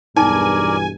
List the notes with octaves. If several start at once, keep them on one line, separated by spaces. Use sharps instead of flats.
B1 E2 G2 D#4 A#4 D5 G#5